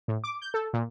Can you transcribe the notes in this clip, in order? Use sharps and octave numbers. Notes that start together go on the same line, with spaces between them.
A2
D6
G6
A4
A#2